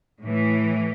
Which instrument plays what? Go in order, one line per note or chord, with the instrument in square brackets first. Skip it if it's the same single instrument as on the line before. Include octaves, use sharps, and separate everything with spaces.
[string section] A2 E3